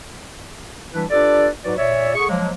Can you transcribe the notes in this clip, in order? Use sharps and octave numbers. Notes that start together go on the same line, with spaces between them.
E3 G3 D4 E4 B4
D4 F4 G4 A4 B4 D5
G#2 F#3 F#4 B4 D5
A#2 C#5 D5 E5
D3 G#4 C#6
F3 F#3 G#3 A#3